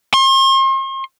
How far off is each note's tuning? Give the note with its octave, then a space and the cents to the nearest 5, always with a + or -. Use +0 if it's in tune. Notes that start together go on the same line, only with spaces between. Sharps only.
C6 +45